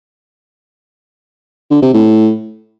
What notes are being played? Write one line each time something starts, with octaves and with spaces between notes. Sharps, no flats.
D3
C3
A2